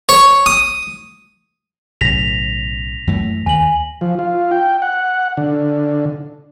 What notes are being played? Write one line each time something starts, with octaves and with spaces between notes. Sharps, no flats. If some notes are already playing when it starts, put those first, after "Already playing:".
C#5
D#6
B1 A2 C#3 A#6 B6 F7
F#2 E3 A3
D#2 G#5 F#7
F3
F4
G5
F#5
D3